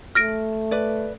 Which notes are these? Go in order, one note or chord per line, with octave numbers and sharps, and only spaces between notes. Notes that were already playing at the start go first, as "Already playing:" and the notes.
A3 F6 A#6 D7
B4 D5